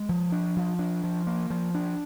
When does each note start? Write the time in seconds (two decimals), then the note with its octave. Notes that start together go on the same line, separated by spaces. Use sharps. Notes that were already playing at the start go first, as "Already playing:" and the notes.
Already playing: G#3
0.09 F3
0.32 D4
0.56 F3
0.79 D4
1.04 F3
1.27 A#3
1.50 F3
1.75 D4